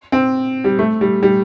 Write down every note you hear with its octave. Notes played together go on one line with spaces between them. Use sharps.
C4
G3
A3
G3
G3